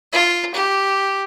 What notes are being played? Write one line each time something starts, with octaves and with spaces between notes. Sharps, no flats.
F4
G4